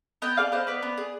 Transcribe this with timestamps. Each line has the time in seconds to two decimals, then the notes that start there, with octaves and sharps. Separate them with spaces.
0.22 B3 D#5 G5
0.37 G#4 D5 F5
0.52 B3 C5 D#5
0.67 B3 B4 D5
0.82 B3
0.98 G#4